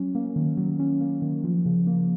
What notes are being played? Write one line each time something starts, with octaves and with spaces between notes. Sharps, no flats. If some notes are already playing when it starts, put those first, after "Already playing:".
Already playing: F#3 C#4
A#3
D#3
F#3
C#4
A#3
D#3
F3
C#3
A#3